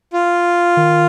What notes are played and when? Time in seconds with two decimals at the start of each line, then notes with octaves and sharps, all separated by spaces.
0.13 F4
0.77 D#3